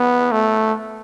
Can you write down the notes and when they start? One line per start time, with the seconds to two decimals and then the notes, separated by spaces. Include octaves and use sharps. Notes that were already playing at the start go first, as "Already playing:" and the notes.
Already playing: B3
0.32 A3